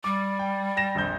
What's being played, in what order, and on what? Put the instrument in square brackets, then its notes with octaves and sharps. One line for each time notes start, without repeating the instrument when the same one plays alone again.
[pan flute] G3 [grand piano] D6
[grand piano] G5
G5 A#6 E7
A#1 F2 G6